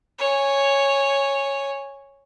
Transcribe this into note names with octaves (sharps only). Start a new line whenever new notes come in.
C#5 G#5